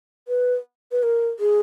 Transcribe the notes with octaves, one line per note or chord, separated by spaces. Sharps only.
B4
B4
A#4
G#4